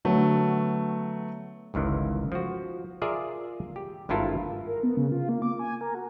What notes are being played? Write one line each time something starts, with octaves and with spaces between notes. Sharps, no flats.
D3 F#3 A3 B3
G1 C#2 D#3 E3
F3 F#4
F4 G#4 A#4 D5 E5 F5
G4
G#1 G2 E4 F4 A4 A#4
A#4
B3
C#3
F4
A#3
D6
G#5
A#4
F#4